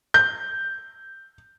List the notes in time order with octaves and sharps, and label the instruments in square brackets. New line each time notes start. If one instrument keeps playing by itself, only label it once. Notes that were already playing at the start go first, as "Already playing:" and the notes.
[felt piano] G6